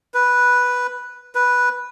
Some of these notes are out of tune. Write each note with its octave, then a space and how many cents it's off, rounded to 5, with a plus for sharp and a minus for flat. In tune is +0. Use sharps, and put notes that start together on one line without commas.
B4 -5
B4 -5